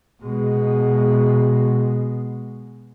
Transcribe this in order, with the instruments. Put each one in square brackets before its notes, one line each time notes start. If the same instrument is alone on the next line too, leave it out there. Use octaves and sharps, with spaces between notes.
[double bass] B2 G#3